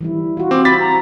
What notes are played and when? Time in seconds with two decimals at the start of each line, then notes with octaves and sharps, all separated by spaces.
0.01 E3 G3 E4
0.37 F4 F#4
0.51 C4 D6
0.65 B5 A6 B6
0.80 A#5